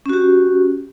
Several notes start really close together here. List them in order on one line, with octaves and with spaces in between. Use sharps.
C#4 F#4 G4